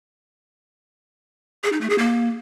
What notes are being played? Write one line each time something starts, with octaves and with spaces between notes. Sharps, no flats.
G#4
D#4
A3
G#4
A#3